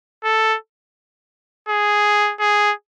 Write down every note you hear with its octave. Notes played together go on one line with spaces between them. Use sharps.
A4
G#4
G#4